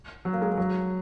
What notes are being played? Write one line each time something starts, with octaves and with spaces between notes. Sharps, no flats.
F#3
A#3
G#3
F#3